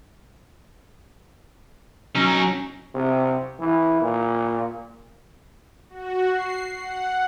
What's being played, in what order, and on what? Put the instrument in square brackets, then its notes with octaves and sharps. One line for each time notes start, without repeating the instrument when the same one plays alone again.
[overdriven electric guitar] F#3 D#4 [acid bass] C#4
[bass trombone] C3
E3
A#2
[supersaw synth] F#4
C7
F#5